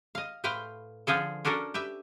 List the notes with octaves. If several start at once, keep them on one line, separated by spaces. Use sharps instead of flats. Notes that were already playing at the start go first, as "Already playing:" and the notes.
D#5 F5
A2 B4 C5 F5 G5
D3 F3 F4 G#4 A4
C#4 D4 F#4 A4 A#4
G4 B4 E5